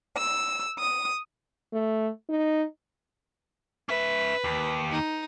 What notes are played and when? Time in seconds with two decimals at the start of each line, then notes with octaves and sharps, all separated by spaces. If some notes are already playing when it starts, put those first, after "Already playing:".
0.18 E6
0.79 D#6
1.73 A3
2.29 D#4
3.89 C#4 B4 E5
4.44 D#2
4.92 D#4